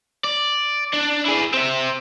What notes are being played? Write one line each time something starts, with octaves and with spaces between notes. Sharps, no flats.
D5
D4
E4 G#4
C4 E5